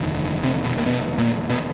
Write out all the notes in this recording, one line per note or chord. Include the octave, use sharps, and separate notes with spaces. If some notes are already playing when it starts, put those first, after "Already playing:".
Already playing: F1 D#2 D3
C3 C4
B2 B3
A#3
B2 B3
A#2 A#3
B2 B3